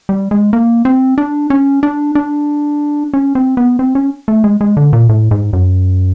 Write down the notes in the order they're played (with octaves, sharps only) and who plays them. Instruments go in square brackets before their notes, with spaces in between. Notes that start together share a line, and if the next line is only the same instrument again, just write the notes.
[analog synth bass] G3
G#3
A#3
C4
D4
C#4
D4
D4
C#4
C4
B3
C4
C#4
A3
G#3
G#3
D3
A#2
A2
G#2
F#2